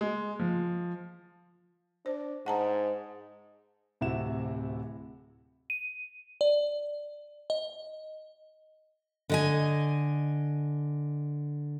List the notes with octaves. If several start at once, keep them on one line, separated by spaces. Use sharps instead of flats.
G#3
F3
D4 C5
G#2 F#5 A5 A#5
D1 C3 E4 F#4 E7
D#7
D5
D#5
D3 D#5 G#5